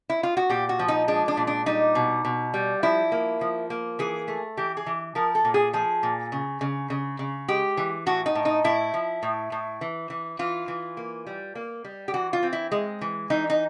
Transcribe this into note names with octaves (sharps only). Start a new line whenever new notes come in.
E4
F4
F#4
A#2 G4
F#4
F3
D#4
G#3 D4
D4
A#2
D4
G3 D#4
B2
B2
G3
F3 E4
A#3
F3
A#3
E3 G#4
A3
E3 G4
G#4
E3
F3 A#4
A4
A#2
G#4
F3 G#4
A#2
C#3
C#3
C#3
C#3
G#3 G4
E3
A2 F#4
D#4
A2
D#4
A2 E4
F3
A2
A2
E3
E3
E3 F4
E3
A#3
G3
A#3
G3
G4
E3 F#4
F4
C4
E4
G#3
E3
E3 D#4
D#4